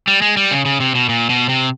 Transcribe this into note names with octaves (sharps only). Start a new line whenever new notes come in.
G3
G#3
G3
C#3
C#3
C3
B2
A#2
B2
C3